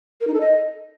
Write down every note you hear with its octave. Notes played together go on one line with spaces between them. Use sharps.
A#4
D#4
A4
D#5